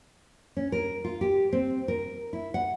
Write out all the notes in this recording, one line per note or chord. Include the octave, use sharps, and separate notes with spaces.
C#4
A#4
F4
G4
C4
A#4
E4
F#5